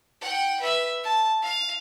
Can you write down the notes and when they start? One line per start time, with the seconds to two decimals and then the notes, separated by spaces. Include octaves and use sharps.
0.21 F#5 G5
0.59 B4 E5
1.03 A5
1.42 F5